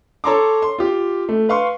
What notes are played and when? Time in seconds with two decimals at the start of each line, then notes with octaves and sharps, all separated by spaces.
0.24 A4 C#5 A5 A#5 C6 D6
0.62 C6
0.78 F4 G4
1.29 A3
1.49 B4 F5 C6 C#6